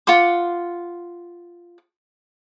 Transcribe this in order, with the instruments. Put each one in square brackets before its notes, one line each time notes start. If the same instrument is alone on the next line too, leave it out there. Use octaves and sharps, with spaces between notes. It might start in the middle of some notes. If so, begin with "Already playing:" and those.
[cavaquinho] F4 F#5 C6 D6